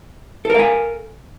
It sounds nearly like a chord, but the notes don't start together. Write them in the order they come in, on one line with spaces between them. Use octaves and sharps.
A4 A#4 F5 G#5